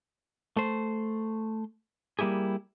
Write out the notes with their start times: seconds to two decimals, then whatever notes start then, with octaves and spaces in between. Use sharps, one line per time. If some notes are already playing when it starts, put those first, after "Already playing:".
0.57 A3 C5
2.19 G3 A#3 E4 G4 G#4